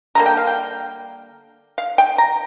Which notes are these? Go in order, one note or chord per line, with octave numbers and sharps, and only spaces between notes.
D3 G3 A#3 A#5
G5
F5
G5
F5
G5
A#5